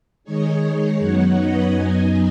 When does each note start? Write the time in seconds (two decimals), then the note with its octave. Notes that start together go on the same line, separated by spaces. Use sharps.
0.24 D#3 G#3 D#4 G#4 C#5
0.62 G#4
0.99 F#2 F#3 B3 D#4 C#5 F#5
1.37 B4 D#5
1.74 F#2 F#3 B3 D#4 D#5 G#5